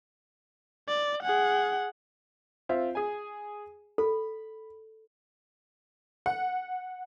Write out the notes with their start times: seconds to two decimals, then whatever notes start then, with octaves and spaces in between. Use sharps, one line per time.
0.88 D5
1.23 G#4 F#5
2.69 C4 F4 E5
2.95 G#4 G#5
3.98 A4 B5
6.26 F#5